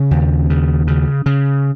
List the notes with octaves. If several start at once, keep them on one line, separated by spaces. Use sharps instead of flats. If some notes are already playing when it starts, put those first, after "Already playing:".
Already playing: C#3 C#4
D#2
C#3
C#3
C#3